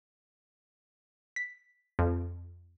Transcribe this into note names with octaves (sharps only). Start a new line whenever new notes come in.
B6
F2